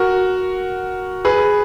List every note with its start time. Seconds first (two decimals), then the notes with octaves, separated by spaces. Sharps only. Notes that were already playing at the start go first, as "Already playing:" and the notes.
Already playing: F#4 A#4
1.25 G#4 B4